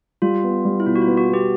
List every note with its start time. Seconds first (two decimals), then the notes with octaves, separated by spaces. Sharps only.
0.22 G3 F4
0.44 B3
0.65 G3
0.80 E4
0.86 B2 F4
0.95 F#4
1.02 F4
1.07 B3
1.17 F#4
1.29 B3 G4